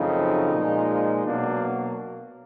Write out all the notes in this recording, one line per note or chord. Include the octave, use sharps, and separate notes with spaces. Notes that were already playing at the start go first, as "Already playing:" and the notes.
Already playing: F#2 C#3 F3 A3 C4 D#4
A#2 F3 G#3
B2 F#3 A#3 D4